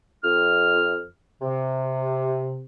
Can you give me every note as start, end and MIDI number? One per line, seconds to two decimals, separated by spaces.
0.23 1.03 41
0.23 1.03 89
1.41 2.66 48